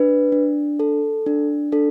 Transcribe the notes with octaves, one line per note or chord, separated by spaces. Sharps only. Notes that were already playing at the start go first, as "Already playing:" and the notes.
Already playing: D4 B4
D4
A4
D4
D4 A4